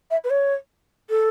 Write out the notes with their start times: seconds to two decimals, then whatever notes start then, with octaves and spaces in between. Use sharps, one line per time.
0.11 E5
0.24 B4
0.30 C#5
1.10 A4